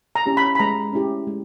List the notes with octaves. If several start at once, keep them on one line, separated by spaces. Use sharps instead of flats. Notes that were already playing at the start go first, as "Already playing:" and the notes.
A#5
C#4 E4 G4
B5
B5
G#3 A#5
C#4 E4 G4
G#3